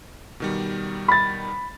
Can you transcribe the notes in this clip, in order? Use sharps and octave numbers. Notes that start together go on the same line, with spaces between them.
B2 D#3 G3
B5 A6